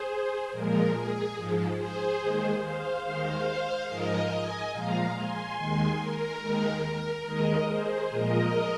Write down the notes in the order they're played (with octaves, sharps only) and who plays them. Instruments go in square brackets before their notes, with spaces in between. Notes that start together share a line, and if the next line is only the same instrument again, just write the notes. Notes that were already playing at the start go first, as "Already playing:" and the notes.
Already playing: [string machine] G#4 C5
A#2 F3 G#3 A#4
G#4
G#2 F3 G#3
G#4 C5
D#2 D#3 G#3
C5 F5
D#2 D#3 G#3 C5 F5
G#2 F3 G#3 A#4 D#5
D#5 G#5
A#2 F3 G#3 F5 A#5
G#5 C6
D#2 D#3 G#3
A#4
D#2 D#3 G#3
A#4
D#2 D#3 G#3 A#4 D#5
G#4 C5
A#2 F3 G#3 A#4 D#5